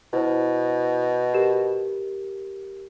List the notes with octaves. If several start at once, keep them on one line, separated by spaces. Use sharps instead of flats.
B2 E4 C5
G4 A#4 E7